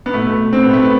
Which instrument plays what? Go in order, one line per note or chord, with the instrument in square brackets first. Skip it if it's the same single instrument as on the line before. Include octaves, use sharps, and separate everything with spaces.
[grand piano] B3
B2 A3
A3
C4
B2 B3
A3
B3